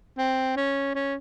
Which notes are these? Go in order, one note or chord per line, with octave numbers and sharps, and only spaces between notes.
C4
C#4
C#4